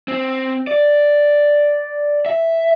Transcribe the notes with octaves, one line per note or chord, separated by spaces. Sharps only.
C4
D5
E5